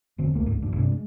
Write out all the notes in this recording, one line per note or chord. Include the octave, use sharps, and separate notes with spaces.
F1 D3 C4
E1 C#2 A3 A#3
F#1 C#2 G#2
A#1 D#2 G#2 D4
G2 C3 A#3 D4
G#3